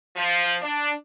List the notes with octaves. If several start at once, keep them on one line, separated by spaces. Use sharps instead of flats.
F3
D4